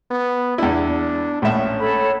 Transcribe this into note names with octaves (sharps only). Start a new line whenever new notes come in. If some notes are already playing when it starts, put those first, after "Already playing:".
B3
E2 D4 E4
A#1 A2 C#4 E5
A4 C#5 B5